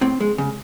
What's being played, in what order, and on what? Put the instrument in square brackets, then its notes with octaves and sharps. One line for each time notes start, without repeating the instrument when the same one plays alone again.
[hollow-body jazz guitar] A2 C4
G#3
C#3